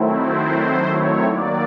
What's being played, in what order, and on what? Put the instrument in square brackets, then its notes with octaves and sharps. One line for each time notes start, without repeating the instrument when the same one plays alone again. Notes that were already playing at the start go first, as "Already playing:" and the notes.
Already playing: [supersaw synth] D#3 F#3 A3 C4 E4
C5
C5
C#5
D#3 F#3 A#3 D5